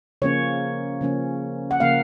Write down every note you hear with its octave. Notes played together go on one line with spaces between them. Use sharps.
C#3 F3 A#3 C#4 C#5
C#3 F3 A#3 C#4
F#5
C#3 F3 A#3 C#4 F5